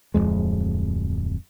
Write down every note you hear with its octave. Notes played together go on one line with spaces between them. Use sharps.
D1 C2 F2 G#3